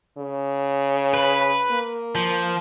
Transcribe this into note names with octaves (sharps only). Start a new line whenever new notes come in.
C#3
B4
A#3
F3